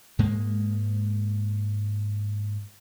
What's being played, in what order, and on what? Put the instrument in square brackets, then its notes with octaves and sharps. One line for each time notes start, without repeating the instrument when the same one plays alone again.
[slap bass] G#2 G#3 A#3